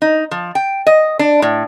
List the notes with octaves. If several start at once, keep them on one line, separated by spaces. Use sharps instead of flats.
D#4
F3
G5
D#5
D4
A2